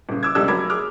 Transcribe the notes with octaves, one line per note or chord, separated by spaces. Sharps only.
D#1 C#3
D6 E6 G#6
E1 C#2 G3 A4 D5 E6
F1 F#3 A#4 B5 D6 G#6
G#4 D6 F6